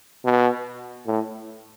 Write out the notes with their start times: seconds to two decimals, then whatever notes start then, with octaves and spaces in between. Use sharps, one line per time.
0.25 B2
1.07 A2